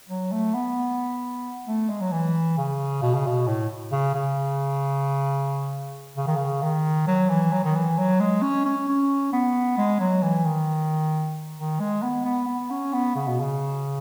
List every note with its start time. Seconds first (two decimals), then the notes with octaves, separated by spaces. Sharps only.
0.09 F#3
0.32 A3
0.55 B3
1.67 A3
1.89 G#3
2.01 F#3
2.12 E3
2.58 C#3
3.02 B2
3.15 C#3
3.27 B2
3.47 A2
3.92 C#3
4.15 C#3
6.17 C#3
6.27 D#3
6.36 C#3
6.63 D#3
7.07 F#3
7.29 E3
7.52 F#3
7.64 D#3
7.76 E3
7.98 F#3
8.20 G#3
8.42 C#4
8.65 C#4
8.88 C#4
9.33 B3
9.78 G#3
10.00 F#3
10.23 E3
10.45 D#3
11.58 D#3
11.80 G#3
12.03 B3
12.25 B3
12.48 B3
12.71 C#4
12.93 B3
13.16 C#3
13.28 B2
13.40 C#3